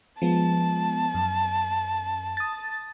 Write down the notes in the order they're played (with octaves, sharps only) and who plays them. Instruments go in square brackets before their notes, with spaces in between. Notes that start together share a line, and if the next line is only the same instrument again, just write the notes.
[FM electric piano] F3 G#3 B3 [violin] A5
[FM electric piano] F#2
D#6 A6